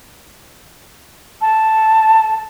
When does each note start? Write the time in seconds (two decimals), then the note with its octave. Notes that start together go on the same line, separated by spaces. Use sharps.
1.41 A5